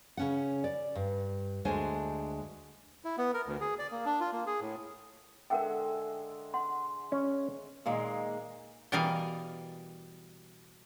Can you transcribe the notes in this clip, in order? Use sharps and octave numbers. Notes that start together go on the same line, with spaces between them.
C#3 C#4 F#5
D5
G2
D2 G#3 D4 C5 G#5
E4
B3
A#4
D2
G#4
D5
A#3
D4
F4
A#3
G#4
A2
D3 G#3 A#4 E5 F#5 G5
F#5 C6
C#4
A#2 D#3 G#3 A#3
B2 E3 G3 A#4 D#5 F5